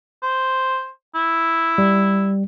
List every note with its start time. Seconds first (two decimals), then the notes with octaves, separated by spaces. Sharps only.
0.23 C5
1.15 E4
1.78 G3